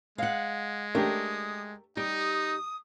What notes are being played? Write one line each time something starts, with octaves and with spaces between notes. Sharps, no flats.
G#3 F5 F#5
A3 D4 G4 A#4 D#6
G3 D#4 G4 D#6